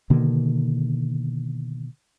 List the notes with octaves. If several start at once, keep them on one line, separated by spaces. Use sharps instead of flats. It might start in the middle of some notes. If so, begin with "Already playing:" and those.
B2 D3 D#3 A#3